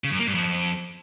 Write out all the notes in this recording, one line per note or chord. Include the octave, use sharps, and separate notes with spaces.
C#3
F#2
A#3
G2
F2